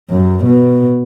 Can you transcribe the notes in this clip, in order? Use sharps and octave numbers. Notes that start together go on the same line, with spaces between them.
F#2
B2